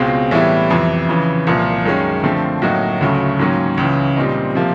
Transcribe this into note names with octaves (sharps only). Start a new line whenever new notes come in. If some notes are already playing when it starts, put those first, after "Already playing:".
Already playing: C#2 B2 G#3 C4 F4
A2 E3 G3 B3 E4
F2 C3 E3
F2 C#3 E3
C2 A#2 F3
F#2 D#3 G#3 C#4
D3 F3 A3 C4
A2 F#3 A#3 D#4 F#4
D2 C#3 F#3 A3
G#2 D#3 F#3 A#3 C#4
C#2 C#3 E3
A#2 G3 C4 D#4
C3 F3 A#3